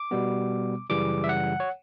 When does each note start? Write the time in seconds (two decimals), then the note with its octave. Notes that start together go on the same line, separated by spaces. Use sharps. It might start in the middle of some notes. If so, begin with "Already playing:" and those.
Already playing: D6
0.11 B2 G3 B3
0.90 F#2 C#3 E3 G3 D6
1.24 E5
1.29 F#5
1.60 C#5